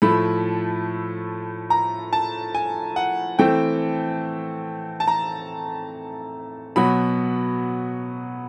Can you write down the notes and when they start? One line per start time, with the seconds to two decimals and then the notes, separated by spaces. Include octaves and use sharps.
0.02 A2 F3 A3 B5
1.70 A#5
2.13 A5
2.55 G#5
2.96 F#5
3.39 E3 A3 C4 G5
5.00 A5
5.08 A#5
6.76 B2 F#3 B3 B5